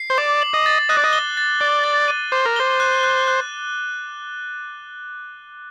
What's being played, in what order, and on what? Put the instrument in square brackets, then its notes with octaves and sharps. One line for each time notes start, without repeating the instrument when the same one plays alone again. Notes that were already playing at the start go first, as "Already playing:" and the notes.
Already playing: [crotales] C7
[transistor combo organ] C5
[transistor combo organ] D5 [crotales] D6
[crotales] F#7
[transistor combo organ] D#5
[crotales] A6
[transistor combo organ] D#5 [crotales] F#6
[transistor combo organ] D5
D#5
[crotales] G7
A6
[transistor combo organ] D5 [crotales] A6
[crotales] A6
D#7
[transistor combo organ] C5 [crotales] D6
[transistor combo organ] A#4
[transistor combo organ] C5 [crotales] G7
[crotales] F#6
F#6
F#6